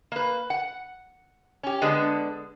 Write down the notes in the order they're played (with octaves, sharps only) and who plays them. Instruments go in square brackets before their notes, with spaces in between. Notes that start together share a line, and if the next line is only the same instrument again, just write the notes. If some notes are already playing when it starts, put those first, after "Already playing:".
[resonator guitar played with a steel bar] A#3 B4
F#5
C#4 G4
D3 G#3 B3 D4